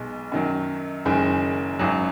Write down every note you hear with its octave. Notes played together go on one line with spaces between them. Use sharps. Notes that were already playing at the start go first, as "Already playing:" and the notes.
Already playing: B1 B2 G#3
F#2 D#3 F#3
F#1 F#2 D#3 G#3
G#1 F#2 F#3